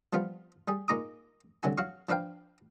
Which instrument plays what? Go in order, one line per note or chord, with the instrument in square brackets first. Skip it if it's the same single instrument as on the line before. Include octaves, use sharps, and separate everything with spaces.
[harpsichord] F3 G3 B3 F4
G3 G#4
A#2 G#3 D#4 A#5 D6 D#6
C2 D3 F#3 F#4 G#5
F#3 F#4 C#5 F5 C#6
F3 D4 B4 F5 G5